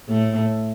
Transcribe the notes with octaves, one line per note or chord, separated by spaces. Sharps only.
A2 A3